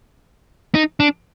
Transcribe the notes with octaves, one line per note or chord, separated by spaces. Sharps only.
D#4
D4